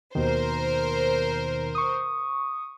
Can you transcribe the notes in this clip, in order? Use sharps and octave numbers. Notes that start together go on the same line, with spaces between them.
D#2 B2 D#3 A#4 C5
C#6 D#6